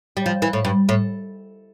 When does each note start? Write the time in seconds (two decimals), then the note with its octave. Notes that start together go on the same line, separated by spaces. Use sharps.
0.17 G3
0.26 F3
0.42 E3
0.53 A2
0.65 G2
0.89 A2